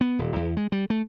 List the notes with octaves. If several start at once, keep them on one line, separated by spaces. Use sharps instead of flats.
B3
D#1
E2
G#3
G3
A3